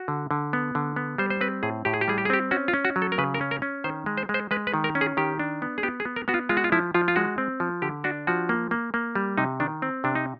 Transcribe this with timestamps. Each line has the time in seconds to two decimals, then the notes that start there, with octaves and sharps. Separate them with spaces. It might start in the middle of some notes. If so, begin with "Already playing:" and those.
Already playing: F#4
0.08 D3
0.31 D3
0.53 B3
0.75 D3
0.96 B3
1.18 G3 C5
1.30 C5
1.41 C4 B4
1.63 A2 G#4
1.85 A2 G4
1.94 G#4
2.01 G4
2.08 G3 G#4
2.18 G4
2.25 G#4
2.30 C4 G4
2.51 C#4 F#4
2.68 F4
2.73 C#4
2.85 F#4
2.96 F#3
3.02 A4
3.12 A#4
3.18 C#3 B4
3.34 A#4
3.41 C#4
3.51 A#4
3.62 C#4
3.84 D#3 C5
4.06 G#3
4.18 C5
4.29 G#3
4.34 C5
4.51 G#3 B4
4.67 B4
4.74 D#3
4.84 A#4
4.95 C#4
5.01 G#4
5.17 D#3 G4
5.40 D4
5.62 B3
5.78 G#4
5.83 B3 G4
6.00 G#4
6.05 B3
6.16 A#4
6.28 B3 F#4
6.34 F4
6.49 G#3 F4
6.57 F#4
6.64 F4
6.72 F3 E4
6.94 F3 F4
7.08 F4
7.16 G#3 F#4
7.38 C4
7.60 F3
7.82 D3 G4
8.04 D4 F#4
8.27 F3 F#4
8.49 A#3
8.71 A#3
8.94 A#3
9.15 G3
9.38 C3 D#4
9.60 D#3 D4
9.82 C4
10.04 C3 D4
10.15 D#4